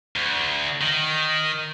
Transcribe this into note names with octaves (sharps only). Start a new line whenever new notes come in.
D2
D#3